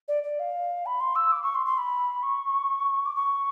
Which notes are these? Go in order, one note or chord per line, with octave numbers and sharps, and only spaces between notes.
D5
D5
F5
B5
C6
E6
D6
C#6
C6
C6
B5
C#6
D6
C#6